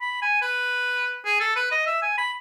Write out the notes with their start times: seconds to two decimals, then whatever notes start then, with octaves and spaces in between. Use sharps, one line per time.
0.01 B5
0.22 G#5
0.42 B4
1.25 G#4
1.40 A4
1.56 B4
1.72 D#5
1.86 E5
2.02 G#5
2.18 B5